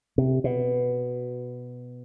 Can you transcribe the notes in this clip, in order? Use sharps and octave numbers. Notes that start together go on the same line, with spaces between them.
C3
B2